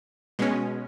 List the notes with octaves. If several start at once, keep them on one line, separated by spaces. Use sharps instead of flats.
B2 G#3 C#4